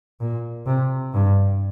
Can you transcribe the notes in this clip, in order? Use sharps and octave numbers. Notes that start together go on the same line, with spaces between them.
A#2
C3
G2